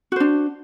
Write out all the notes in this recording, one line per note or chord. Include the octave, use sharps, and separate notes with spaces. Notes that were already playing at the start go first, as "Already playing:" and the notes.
D4 F#4 C5